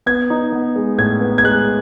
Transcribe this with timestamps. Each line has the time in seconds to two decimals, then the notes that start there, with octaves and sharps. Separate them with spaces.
0.06 B3 G#6
0.30 D#4
0.52 B3
0.76 G#3
0.98 A2 G#6
1.21 B3
1.38 G#6
1.44 G#3 F#6